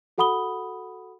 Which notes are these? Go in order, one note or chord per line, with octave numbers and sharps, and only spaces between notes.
F#4 A4 F#5 B5 D#6 G7